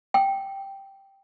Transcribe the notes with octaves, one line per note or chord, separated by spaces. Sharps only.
G5